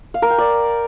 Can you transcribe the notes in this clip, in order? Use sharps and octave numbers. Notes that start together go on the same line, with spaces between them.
F5
A#4
G5
D5